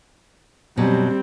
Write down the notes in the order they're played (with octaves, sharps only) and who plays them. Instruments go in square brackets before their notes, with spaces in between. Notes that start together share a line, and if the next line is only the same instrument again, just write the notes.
[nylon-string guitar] F#2 B2 F#3 [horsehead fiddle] G3 C4